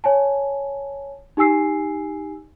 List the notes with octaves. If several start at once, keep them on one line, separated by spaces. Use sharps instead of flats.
C#5 G#5 A5
D#4 G4 G#5 E6 C7